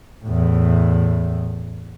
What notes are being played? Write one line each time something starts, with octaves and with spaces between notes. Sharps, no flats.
E2 A2